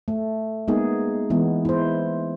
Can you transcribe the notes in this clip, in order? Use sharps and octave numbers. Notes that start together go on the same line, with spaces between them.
A3
G#3 A#3 B3 D#4 G#4
E3 G#3 B3
E4 C5